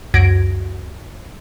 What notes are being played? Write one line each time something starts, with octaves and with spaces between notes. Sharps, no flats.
C#2 F#2 F#4 G#6 A#6 D7